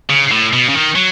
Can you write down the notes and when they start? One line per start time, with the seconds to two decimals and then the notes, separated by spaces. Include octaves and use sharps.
0.10 C#3
0.31 A2
0.53 B2
0.69 C#3
0.74 D#3
0.95 F#3